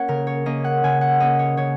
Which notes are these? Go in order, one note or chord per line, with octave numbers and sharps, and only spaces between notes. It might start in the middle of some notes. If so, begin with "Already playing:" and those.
Already playing: A#3 C#4 C#5 F#5
C#3 A#4
C#5
A#3 C#4 D#5
F#5
C#3 G#5
F#5
A#3 C#4 D#5
C#5
C#3 C#5